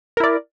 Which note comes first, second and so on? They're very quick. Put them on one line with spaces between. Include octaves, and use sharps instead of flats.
A#4 E4 D5